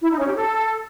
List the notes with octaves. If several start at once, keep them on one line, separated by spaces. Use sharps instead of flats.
E4
D#4
C#4
G4
A4